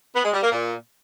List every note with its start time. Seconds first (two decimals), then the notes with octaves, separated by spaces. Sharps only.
0.15 B3
0.24 G#3
0.34 G3
0.43 A#3
0.52 A#2